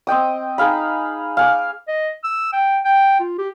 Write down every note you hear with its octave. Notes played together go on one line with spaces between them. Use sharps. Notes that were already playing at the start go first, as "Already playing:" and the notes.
C4 D#5 G5 D#6
D#4 G#4 F5 B5
F5 G#5 D6
D#5
E6
G5
G5
F4
G4